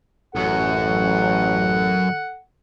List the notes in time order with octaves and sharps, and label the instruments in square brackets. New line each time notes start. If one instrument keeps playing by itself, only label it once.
[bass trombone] A1 [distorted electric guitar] F#2 [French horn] A4 [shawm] F#5